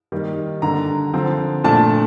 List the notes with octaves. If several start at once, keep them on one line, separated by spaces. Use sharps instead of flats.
D#3 G3 A#3
D3 G3 A#3 D4 A#5
D3 F3 C4
A#2 A3 D4 A5